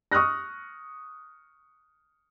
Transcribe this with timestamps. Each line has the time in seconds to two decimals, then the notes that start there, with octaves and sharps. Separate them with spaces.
0.12 C#6 D#6 F6 F#6 A#6